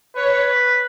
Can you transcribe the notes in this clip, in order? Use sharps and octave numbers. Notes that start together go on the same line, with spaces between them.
B4 C#5